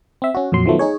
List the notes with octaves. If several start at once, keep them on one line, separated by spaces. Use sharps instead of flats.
C4 E5
C#4 F#4
F2 A#2 F#3 C6
D#3 F3 F#3 A3 B3
D#4 G#4 C#5